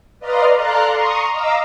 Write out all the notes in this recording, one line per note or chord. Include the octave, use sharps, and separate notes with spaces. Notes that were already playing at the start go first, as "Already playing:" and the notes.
B4 D5 D#5 F5 A#5 C6
A4 D5 F5 A#5 C6 F#6
A#5 C6 C#6 D#6
D#5 F5 A#5 D6 E6